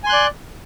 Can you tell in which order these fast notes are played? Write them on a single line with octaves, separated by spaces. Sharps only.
G#5 C6 F#6 D5